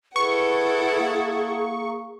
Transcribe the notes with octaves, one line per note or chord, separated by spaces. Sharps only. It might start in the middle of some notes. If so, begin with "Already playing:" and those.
E4 G#4 A4 B4 F#5 C#6
A#3